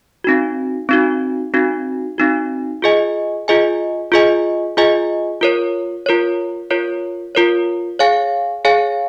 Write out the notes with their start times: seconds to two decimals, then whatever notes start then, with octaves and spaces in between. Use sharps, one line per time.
0.24 C4 D#4 F#4
0.89 C4 D#4 F#4
1.54 C4 D#4 F#4
2.18 C4 D#4 F#4
2.82 F4 G#4 D#5 G#5
3.48 F4 G#4 D#5 G#5
4.12 F4 G#4 D#5 G#5
4.77 F4 G#4 D#5 G#5
5.41 F4 A#4 C#5
6.06 F4 A#4 C#5
6.70 F4 A#4 C#5
7.35 F4 A#4 C#5
7.99 G#4 C#5 F5 G#5
8.65 G#4 C#5 F5 G#5